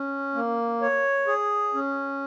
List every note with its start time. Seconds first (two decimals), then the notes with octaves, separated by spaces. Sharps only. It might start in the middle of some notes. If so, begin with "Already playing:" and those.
Already playing: C#4
0.35 A#3
0.81 C#5
1.27 G#4
1.74 C#4